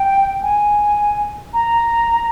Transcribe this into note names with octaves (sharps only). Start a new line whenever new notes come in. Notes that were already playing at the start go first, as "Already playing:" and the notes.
Already playing: G5
G#5
A#5